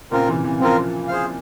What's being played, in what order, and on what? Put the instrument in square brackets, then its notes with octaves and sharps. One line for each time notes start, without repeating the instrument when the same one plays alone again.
[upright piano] A#2 C#3 [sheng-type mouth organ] C4 F4 A#4
[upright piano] C3 E3
C3 E3
[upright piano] C#3 F3 [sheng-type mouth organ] C4 F4 A#4
[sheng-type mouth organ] G#4 C5 F5